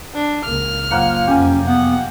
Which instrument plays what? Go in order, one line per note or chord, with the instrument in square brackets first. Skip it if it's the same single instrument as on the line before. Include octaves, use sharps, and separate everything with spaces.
[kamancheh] D4
[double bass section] C#2 A#3 [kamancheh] F6
[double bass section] F#1 [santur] F3 A#3 F#5
[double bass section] F2 C3 F#3 [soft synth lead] C#4 [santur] G4 G#5
[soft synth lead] B3 [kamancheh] F#5